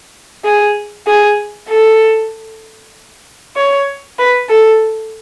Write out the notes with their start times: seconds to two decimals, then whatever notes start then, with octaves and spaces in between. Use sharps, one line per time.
0.44 G#4
1.07 G#4
1.69 A4
3.57 C#5
4.19 B4
4.49 A4